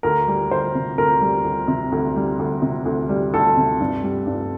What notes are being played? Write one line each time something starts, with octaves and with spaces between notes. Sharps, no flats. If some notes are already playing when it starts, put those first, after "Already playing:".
D2 A#4
G3
D2 C5
C3
D2 A#4
G3
D2
C3
D2
G3
D2
C3
D2
G3
D2 A4
C3
G2
G3
G2